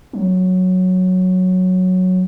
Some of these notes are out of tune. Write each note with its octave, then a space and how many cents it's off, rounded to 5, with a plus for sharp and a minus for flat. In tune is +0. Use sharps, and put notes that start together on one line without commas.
F#3 -5